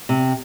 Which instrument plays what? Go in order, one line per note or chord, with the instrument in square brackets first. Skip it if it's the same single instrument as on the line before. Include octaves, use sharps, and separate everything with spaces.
[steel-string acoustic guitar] C3